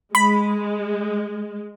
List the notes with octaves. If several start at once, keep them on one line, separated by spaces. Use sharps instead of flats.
G#3 B5